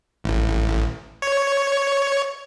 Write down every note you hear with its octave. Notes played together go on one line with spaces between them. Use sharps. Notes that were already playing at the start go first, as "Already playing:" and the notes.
A1
C#5